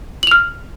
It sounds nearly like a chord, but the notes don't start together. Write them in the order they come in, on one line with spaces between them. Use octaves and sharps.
F#7 F7 F6